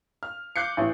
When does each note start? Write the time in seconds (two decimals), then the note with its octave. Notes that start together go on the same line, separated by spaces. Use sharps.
0.23 F6
0.56 D6 F#6 G6 C7 C#7
0.77 A1 E3